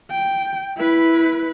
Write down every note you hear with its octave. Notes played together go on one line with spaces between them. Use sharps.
G5
E4 B4